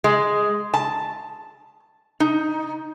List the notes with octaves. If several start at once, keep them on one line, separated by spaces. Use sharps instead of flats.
G#3
A5
D#4